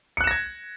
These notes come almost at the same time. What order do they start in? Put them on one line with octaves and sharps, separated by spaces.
C#7 F#6 E7 A#6 G#6